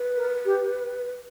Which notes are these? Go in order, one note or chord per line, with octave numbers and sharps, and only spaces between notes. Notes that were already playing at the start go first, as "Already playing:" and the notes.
Already playing: B4
A#4
G4